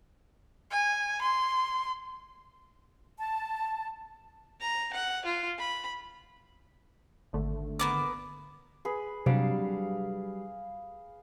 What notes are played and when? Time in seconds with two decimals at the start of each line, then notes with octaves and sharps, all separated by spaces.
0.71 G#5
1.21 C6
3.18 A5
4.60 A#5
4.94 F#5
5.25 F4
5.58 B5
7.33 G#1 D3 A3
7.79 A#3 B3 D6
8.85 G#4 B4
9.26 C3 F#3 G3 D4 F5